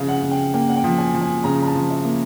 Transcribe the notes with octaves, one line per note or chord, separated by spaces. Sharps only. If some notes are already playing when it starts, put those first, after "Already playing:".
Already playing: C#3 F3 E5 F5
F#5
C#3
G5
A#3 G5
F#5
G5
F3
G#5
F3
G#5
C#3 A#5
A#5
A5
F3
E5
A#3